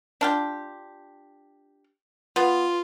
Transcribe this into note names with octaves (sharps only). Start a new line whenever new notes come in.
D4 F4 G4
B3 F4